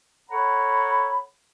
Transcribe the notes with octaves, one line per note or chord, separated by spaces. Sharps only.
A4 C#5 F#5 A#5 B5